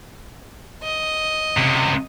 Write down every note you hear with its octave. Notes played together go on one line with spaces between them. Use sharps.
D#5
C#2 C3